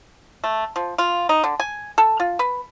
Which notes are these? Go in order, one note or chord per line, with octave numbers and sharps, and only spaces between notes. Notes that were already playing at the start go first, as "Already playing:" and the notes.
A3
F3
F4
D#4
D3
G#5
A4
F4
B4